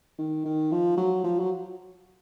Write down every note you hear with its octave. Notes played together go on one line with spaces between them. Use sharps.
D#3
D#3
F3
F#3
F3
F#3